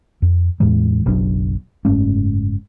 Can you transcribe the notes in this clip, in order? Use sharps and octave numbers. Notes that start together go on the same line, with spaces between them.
F2
E2 A2 E3 G#3
F#1 B1 F#3 D4
F#1 G#2 A3 C#4